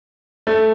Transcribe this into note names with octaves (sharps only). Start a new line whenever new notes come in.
A3